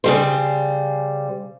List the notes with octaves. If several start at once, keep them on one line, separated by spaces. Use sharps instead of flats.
C#3 G3 C5